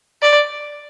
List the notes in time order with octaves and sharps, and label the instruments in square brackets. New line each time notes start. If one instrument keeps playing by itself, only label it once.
[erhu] D5